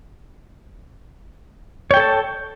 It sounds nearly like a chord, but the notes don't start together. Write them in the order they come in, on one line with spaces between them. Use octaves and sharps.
C#5 G5 A4 A5